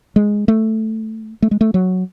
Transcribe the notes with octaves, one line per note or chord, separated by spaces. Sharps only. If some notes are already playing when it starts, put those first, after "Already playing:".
G#3
A3
A3
G#3
A3
F#3